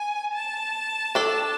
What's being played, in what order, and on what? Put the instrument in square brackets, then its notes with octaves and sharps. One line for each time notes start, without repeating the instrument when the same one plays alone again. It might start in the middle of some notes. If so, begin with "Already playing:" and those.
Already playing: [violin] G#5
A5
[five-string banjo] D4 A4 D5